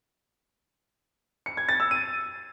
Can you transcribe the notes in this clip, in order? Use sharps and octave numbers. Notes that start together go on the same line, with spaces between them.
C#7
G#6
A6
E6
D#7